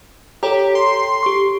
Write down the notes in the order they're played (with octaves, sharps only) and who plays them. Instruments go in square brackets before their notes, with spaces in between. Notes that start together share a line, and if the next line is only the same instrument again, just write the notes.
[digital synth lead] G4 [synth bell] A4 C#5 A#5
[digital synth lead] C6
[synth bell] G4 C#6